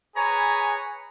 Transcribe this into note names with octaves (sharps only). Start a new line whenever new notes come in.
G#4 B4 C#5 G#5 A#5